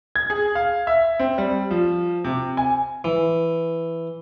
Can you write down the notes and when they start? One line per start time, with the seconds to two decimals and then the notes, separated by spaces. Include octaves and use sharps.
0.16 G#6
0.30 G#4
0.55 F5
0.87 E5
1.19 C4
1.38 G3
1.71 F3
2.24 C3
2.57 G#5
3.04 E3